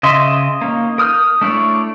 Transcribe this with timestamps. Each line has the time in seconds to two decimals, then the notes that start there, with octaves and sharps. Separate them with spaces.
0.03 C#3 D#5 E5 C6
0.62 A#3 C#4 D#4
0.98 A#4 D#6 F6 G6
1.41 A3 D4 E4 C#5 D5